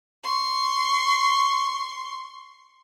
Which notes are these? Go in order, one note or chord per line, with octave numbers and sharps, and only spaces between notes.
C6 C#6